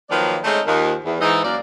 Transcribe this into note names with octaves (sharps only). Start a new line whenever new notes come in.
D#3 F3 F#3 A#3 B4 D5
G#3 A3 C4 C#4 D#4 C5
D#2 D#3 F3
E2
G#2 E3 D#4
F#2 A#3 D5